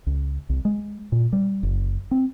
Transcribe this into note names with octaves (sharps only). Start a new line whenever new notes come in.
C#2
C2
G#3
A#2
G3
F#1
C4